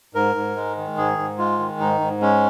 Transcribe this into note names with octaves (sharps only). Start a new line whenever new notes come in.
G#2 A#4
G#2
G#3
D#3
G#2 G#4
G#2
G#3 F4
D#3
G#2 D#4
G#2
G#3 C#4